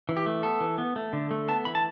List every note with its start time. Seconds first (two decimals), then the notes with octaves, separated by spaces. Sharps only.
0.09 E3
0.17 G4
0.26 A3
0.43 B3 A4
0.61 E3
0.78 B3
0.96 A3
1.13 D3
1.31 A3
1.48 B3 A5
1.65 E3 B5
1.75 A5